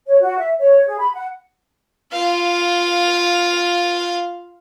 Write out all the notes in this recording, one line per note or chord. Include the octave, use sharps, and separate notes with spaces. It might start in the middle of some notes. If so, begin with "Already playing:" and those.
C#5
F#4
E5
C#5
G#4
B5
F#5
F4 F5